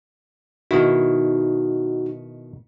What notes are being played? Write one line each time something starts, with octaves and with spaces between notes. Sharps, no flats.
B2 D#3 D#4 E4 F#4